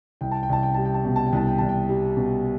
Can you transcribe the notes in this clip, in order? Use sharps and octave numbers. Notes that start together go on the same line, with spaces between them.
C2 G5
A5
G5
C2 A5
G5
G3 A5
G5
A5
B2 G5
A5
G5
C2 A5
G5
C2 A5
G5
G3
B2